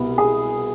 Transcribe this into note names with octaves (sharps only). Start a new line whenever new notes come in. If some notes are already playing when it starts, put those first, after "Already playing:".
Already playing: C2 B2 B3
G#4